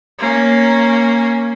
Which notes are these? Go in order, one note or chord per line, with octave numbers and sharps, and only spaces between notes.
A#3 C#4